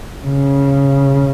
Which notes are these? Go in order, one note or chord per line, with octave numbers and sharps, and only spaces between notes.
C#3